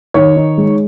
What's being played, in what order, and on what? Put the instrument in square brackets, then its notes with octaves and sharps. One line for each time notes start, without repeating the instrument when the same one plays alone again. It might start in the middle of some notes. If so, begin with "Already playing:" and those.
[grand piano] D#3 [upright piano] C#5
[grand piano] D#4
G#3